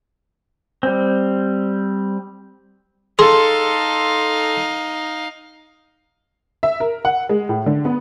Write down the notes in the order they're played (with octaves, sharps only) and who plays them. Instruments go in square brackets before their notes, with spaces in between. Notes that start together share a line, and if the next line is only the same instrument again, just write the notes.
[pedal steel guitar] G3 C4
[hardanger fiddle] D#4 F5 [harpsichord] G#4 [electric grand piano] A4 C6
[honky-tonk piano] E5
A#4
F#5
G#3
A2
D3
B3